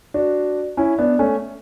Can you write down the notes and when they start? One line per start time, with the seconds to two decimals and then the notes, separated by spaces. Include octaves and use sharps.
0.14 D4 F#4
0.77 C#4 E4
0.99 B3 D4
1.19 A3 C#4